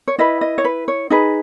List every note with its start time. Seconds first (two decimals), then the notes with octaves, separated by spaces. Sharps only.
0.08 C#5
0.18 E4 B4 D#5
0.41 D#5
0.58 C#5
0.65 B4
0.88 C#5
1.10 D#4 G#4 B4 D#5